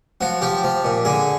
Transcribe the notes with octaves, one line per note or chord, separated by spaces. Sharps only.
F3 F#4
F3 G4
F3
A#2
D3 G#4